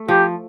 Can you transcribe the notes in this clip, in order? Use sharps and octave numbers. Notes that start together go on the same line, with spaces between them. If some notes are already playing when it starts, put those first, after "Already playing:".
Already playing: A3
F3 G4